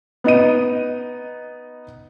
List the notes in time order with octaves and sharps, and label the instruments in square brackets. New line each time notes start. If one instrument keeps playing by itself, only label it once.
[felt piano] B3 D#4 D#5 D#7